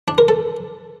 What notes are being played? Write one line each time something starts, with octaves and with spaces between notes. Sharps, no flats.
D4
A#4
A4